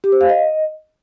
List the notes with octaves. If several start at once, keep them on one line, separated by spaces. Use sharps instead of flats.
G4
C5
F5
D#5